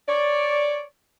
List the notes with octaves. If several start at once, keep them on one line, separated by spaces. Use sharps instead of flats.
C#5 D5